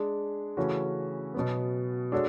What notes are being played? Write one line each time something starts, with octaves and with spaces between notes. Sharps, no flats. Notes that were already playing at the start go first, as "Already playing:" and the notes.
Already playing: G#3 D4 G#4
C#3 E3 A3 C#4 F#4
B2 F#3 B3
G#3 D4 F#4 A4 C#5